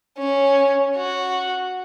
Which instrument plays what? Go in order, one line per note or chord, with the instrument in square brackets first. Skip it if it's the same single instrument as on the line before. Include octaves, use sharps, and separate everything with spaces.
[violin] C#4
F#4